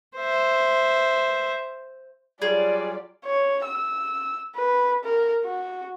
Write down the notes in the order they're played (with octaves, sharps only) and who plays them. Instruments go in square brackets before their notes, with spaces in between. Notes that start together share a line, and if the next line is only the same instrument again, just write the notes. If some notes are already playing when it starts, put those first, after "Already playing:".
[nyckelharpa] C5 E5
[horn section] F#3 G3 F4 [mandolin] G#4 [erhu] D5
[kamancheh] C#5
E6
B4
A#4
F#4